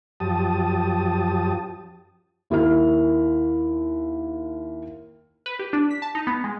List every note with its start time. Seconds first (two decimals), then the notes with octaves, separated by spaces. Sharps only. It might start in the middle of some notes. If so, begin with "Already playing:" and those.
0.20 F#2 F3 G4 A5 D#6
2.50 D#2 E4 A#4 F6
5.46 B4
5.59 G4
5.73 D4
5.91 B6
6.02 A5
6.15 D#4
6.27 B3
6.44 G#3